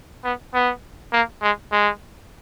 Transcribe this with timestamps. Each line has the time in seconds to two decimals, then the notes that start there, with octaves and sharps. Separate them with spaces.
0.24 B3
0.54 B3
1.13 A#3
1.42 G#3
1.72 G#3